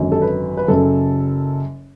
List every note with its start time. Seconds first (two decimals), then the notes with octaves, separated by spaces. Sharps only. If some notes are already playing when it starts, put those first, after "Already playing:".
Already playing: G#1 F#2 D3
0.12 A4
0.22 B4
0.57 B4
0.68 F#1 F#2 C#3 A4